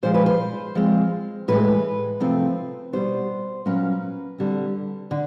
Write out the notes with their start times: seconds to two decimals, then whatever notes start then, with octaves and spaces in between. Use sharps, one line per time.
0.03 A#2 F3 G#3 C5
0.14 B4
0.26 C5
0.75 F3 G#3 C4
1.48 A2 E3 G#3 B4
2.20 C3 F3 A3 C4
2.93 B2 G3 B3 C5
3.66 A#2 F#3 A#3 C#4 B4
4.38 D3 G3 C4
5.11 D3